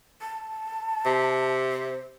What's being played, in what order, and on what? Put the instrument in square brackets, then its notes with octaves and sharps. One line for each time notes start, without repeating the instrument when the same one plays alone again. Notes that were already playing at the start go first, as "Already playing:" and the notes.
[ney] A5
[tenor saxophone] C3
[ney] C5